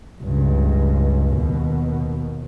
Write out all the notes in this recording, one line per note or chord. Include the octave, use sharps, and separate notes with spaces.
C#2 G2
D#2 B2